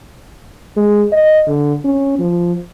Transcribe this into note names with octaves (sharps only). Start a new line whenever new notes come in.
G#3
D#5
D3
C#4
F3